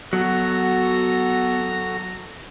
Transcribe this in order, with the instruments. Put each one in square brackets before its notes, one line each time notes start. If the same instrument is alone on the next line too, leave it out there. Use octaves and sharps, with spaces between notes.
[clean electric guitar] F#3 [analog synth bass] B3 [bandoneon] F#4 A4 [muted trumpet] A#5